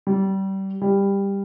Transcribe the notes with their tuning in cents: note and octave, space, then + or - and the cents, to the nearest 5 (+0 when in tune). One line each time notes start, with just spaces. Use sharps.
G3 -25
G3 +15